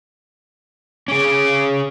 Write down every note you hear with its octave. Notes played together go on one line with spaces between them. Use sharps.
C#4 G#4 D6